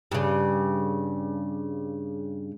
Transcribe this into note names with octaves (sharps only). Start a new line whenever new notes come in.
G2 C#3